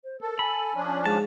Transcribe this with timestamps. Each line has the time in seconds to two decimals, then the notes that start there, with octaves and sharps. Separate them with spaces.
0.04 C5
0.21 A4 A#4
0.39 G#5 B5
0.75 F3 C#4 D4
1.06 G#2 A5